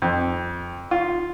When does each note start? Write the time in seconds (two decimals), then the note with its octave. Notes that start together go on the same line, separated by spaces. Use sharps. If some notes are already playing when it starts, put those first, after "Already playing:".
0.02 F2
0.91 F4